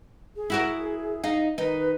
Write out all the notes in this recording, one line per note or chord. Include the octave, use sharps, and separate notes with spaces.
G#4
E4 F#4 A#4
D#4 F5
D#3 D#4 B4